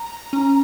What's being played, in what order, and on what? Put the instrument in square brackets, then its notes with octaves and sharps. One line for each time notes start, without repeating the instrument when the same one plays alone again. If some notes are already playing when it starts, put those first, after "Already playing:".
Already playing: [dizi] A#5
[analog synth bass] C#4